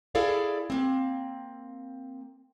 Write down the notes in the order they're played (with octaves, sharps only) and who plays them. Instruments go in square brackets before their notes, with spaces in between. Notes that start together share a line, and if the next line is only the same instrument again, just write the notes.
[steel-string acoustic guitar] E4 G#4 A4 D5 F5
A#3 C4